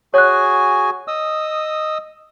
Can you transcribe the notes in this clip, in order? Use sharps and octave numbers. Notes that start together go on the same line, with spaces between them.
F#4 G#4 C#5 G#5 F#6
D#5 D#6 E6